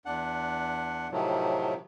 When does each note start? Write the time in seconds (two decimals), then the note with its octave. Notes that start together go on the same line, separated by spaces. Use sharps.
0.06 E2 D4 F#5
1.12 A2 C3 D#3 F3 F#3